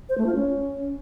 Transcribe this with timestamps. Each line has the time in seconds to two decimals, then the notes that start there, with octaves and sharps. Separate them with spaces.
0.09 C5
0.18 A3
0.26 F4
0.35 C#4